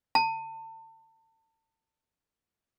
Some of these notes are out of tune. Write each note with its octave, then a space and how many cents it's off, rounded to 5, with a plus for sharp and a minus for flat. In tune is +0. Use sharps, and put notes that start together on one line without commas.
A5 +35